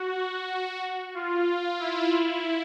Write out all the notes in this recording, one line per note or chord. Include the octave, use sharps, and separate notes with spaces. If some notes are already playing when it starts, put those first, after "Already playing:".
Already playing: F#4
F4
E4
E4